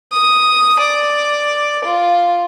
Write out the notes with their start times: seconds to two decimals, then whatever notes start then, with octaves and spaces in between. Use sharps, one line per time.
0.13 D#6
0.79 D5
1.84 F4